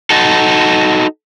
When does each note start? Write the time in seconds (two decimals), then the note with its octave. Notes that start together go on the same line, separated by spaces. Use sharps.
0.10 D#4 F#4 A4